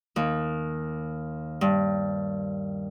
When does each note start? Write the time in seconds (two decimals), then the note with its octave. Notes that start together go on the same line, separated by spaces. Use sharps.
0.16 D#2
1.61 G2